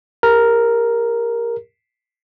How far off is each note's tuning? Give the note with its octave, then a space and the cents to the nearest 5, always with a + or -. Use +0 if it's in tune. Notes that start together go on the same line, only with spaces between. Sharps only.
G4 +45 A#4 +0